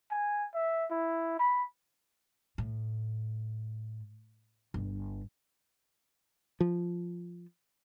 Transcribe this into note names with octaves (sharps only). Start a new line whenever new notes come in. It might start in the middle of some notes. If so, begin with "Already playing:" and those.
G#5
E5
E4
B5
A2
G1
F3